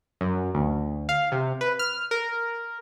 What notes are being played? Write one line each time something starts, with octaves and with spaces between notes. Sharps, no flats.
F#2
D2
F5
C3
B4
F6
A#4